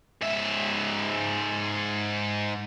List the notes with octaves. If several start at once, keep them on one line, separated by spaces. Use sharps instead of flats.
G#2 E5